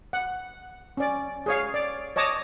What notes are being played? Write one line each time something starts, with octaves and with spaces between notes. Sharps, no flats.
F#5
C#4 D5
G#4 C#5 F5
D5
C#5 D#5 A5 D6 D#6